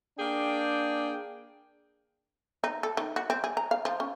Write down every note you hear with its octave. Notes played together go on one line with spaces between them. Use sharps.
A#3 D4 G#4 G5
D#4
A4
D#3
F#4
C4
G#4
A#5
F5
F3
C#4